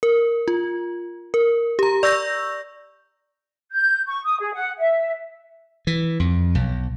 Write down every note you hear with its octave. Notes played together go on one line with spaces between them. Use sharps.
A#4
F4
A#4
G4 A#5
D5 C#6 E6 G6 A#6
G6
C#6
D#6
G#4
F#5
E5
E3
F2
B1